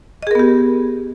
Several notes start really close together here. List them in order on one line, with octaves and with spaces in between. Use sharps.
D#5 G#4 A#4 B3 G4